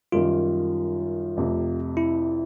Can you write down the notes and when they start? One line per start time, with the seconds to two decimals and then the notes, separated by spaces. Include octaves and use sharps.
0.12 F#2 D#3 G3 F4
1.36 F1 F2 C3
1.97 E4